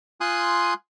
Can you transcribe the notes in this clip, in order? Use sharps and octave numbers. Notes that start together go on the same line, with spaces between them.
F4 G#5 C6 D#6 F#6